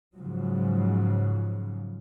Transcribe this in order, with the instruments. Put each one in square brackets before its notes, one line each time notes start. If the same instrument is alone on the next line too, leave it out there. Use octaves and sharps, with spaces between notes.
[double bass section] G#2 C#3 F3 F#3